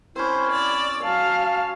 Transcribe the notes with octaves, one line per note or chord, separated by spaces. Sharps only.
C4 C#4 E4 C5
D5 E6
F#3 F5 A5